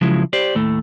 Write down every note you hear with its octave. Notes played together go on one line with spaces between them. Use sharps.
C#3 F3 F#3 G#3 E4
G4 C5 D5
D#2 A2 A3